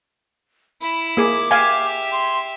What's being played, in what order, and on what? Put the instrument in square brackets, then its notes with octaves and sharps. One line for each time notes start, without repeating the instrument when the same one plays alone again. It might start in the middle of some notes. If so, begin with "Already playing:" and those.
[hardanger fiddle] E4 [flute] B5
[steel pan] A#3 G#4 [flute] D6
[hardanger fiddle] G4 E5 [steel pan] F5 G#5
[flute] C6